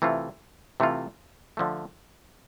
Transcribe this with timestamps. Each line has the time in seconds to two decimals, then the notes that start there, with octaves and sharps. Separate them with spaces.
0.02 C3 E3 A3 C4 F4
0.80 C3 E3 A3 C4 F4
1.57 D3 F3 A3